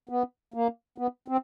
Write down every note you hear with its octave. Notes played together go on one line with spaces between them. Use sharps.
B3
A#3
B3
C4